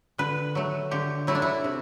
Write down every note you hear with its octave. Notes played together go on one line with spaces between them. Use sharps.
D3 B4
F#3 A3
D3 G4
F#3 A3 E4
D4
E4
C3